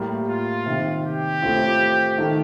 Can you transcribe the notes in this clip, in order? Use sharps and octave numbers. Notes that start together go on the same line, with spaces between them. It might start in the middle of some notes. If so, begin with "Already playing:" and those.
Already playing: A2 G3 A#3
F4
C3 D#3 G3
G4
A1 A2 A3 C4 F4
D#3 A3